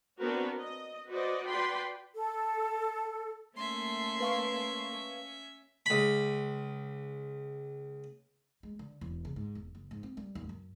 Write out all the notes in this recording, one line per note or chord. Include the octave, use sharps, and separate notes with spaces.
B3 C4 D4 F#4 A#4 B4
D#5
F#4 B4 C5 D5 D#5
F#4 B4 D5 G5 B5 C6
A4
A3 A#3 C#4 E5 C6
B4 F5 C#6
C#2 B5
G#3
D3
E1
C#3
G#2
E1
F#1
G#2
C4
G3
D#1
F#2